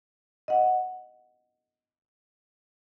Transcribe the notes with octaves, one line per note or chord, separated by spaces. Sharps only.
D#5 F#5